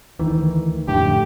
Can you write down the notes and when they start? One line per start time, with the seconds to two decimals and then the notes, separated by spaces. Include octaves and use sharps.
0.19 D2 D#3 E3
0.88 F2 A2 D3 G4